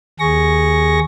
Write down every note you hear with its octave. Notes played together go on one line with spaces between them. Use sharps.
D#2 G#4 C#6 A#6